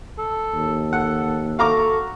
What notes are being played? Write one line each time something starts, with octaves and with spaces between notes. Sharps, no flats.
A4
D#2
A4 F#5
F#4 A4 F5 A#5 D6